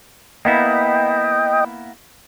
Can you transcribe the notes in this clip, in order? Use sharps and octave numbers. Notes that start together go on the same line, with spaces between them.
A#3 B3 E4 D#5 G5